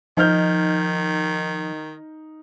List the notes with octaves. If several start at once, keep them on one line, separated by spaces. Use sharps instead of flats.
D#3 F3 D#4 F6 G6